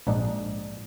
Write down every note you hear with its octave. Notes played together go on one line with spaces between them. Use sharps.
A#1 G#2 D4 D#4